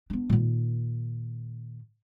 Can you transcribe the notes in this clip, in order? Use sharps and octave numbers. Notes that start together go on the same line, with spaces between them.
B3 D4
A#2 D#3